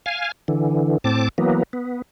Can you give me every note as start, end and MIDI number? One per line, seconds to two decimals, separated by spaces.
0.06 0.32 77
0.06 0.32 80
0.48 0.98 50
0.48 0.98 52
1.04 1.29 45
1.04 1.29 60
1.04 1.29 81
1.04 1.29 86
1.38 1.63 52
1.38 1.63 54
1.38 1.63 58
1.38 1.63 59
1.73 2.02 59